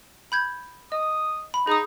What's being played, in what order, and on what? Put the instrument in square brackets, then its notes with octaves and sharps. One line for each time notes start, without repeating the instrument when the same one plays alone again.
[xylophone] B5 G6 G#6
[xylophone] D#5 [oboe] D#6
[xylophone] B5
[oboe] D#4 [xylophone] G#4 D#6